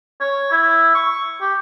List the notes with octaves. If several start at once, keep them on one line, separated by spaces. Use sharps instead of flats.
C#5
E4
C#6
G4